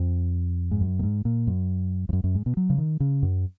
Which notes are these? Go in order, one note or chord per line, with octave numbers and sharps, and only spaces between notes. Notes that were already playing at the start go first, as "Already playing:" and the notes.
Already playing: F2
G#2
F#2
A#2
G#2
A#2
F#2
F2
F#2
F#2
G#2
B2
F#3
C#3
D#3
C#3
F#2